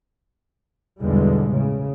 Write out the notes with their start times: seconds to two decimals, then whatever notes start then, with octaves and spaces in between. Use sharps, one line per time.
1.01 B1 E2 B2 D3 G3 G#3
1.51 A2 C#3